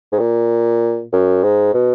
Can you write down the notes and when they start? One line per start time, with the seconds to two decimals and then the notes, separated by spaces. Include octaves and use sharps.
0.12 G#2
0.19 A#2
1.12 F#2
1.43 G#2
1.74 B2